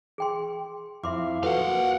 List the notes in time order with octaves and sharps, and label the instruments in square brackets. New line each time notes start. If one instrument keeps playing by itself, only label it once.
[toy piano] G#4 G5 C6
[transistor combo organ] F2 E4 F5 [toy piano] E5 C6 D6
[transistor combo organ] F3 F#4 [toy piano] A4 B4 [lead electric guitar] F5 F#5
[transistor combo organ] A#3 F#4